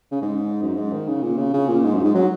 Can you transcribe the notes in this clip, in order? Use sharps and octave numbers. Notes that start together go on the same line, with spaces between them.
C#3
G#2
F#2
G#2
D#3
C#3
A#2
C#3
C#3
A#2
G#2
F#2
G#2
F#3